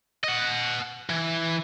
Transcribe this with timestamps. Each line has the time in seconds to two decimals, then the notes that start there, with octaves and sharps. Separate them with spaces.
0.24 D#5 F#5
1.09 E3